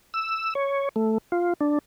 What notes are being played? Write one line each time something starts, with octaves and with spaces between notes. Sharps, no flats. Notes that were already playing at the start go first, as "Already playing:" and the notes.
E6
C#5
A3
F4
D4